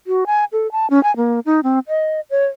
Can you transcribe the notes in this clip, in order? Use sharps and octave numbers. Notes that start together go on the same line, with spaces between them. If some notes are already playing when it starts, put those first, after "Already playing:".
F#4
G#5
A4
A5
C#4
G#5
A#3
D#4
C4
D#5
C#5